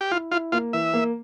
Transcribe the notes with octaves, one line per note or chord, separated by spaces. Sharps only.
G4
E4 F4
E4 F4
A#3 F4
E3 E5
A#3